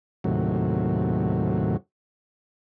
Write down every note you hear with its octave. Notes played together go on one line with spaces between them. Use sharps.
D#2 A2 C3 F#3